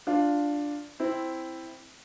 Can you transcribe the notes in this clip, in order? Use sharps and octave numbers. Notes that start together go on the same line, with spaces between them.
D4 F4
C4 E4